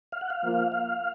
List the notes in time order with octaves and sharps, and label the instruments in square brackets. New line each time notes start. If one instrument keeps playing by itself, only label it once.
[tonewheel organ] F5
F#5
F5
[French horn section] F3 A#3 F4
[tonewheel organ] F5